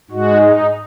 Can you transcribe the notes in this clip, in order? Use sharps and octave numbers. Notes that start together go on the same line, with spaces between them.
G#2 G#3 F#4
D#4